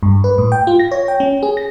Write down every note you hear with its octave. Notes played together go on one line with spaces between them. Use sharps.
G2
B4
A2
G5
F4
A#6
C#5
G5
C#4
G#4
A#6